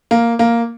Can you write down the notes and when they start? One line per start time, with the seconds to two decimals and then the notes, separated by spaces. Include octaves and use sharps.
0.11 A#3
0.39 A#3